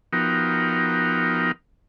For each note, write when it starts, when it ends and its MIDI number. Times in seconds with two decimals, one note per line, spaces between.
0.13 1.52 53
0.13 1.52 59
0.13 1.52 63
0.13 1.52 66
0.13 1.52 70
0.13 1.52 79